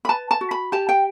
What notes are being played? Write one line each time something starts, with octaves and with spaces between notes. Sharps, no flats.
B5
B4 A5
A5
F#4
B5
G4 A5
G5